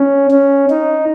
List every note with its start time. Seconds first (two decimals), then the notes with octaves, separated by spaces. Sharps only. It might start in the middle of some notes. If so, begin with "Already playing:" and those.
Already playing: C#4
0.31 C#4
0.70 D#4